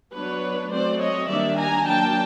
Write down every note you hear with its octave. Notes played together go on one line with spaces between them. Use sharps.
F#3 B3 D4 B4 C#5
F#3 A3 C4 C5 D5
C#5 D#5
D#3 G3 A#3 D4 D5 E5
G#5 A#5
F#3 A#3 D4 G5 A5